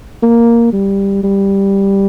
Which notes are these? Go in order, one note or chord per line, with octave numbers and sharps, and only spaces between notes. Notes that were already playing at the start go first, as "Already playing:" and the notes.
A#3
G3
G3